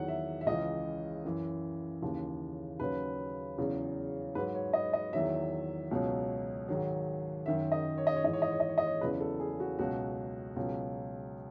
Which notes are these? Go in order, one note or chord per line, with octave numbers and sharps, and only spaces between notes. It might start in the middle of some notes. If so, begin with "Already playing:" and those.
Already playing: E2 D#3 F#3 F#5
E5
E5
C#2 C#3 E3 D#5
F#2 E3
D#2 C#3 E3
D#2 C#3 F#3 B4
E2 C#3 F#3
G#2 F#3 B4
C#5
D#5
D#5
E2 D#3 F#3 E5
C#2 B2 F#3
G#2 D#3 F#3
F#2 D#3 F#3 E5
D#5
C#5
D#5
C#5
G#2 E3 D#5
C#5
D#5
C#5
D#5
C#5
D#5
C#5
E2 C#3 F#3 B4
A4
G#4
F#4
C#2 B2 F#3 F#4
C#2 B2 F#3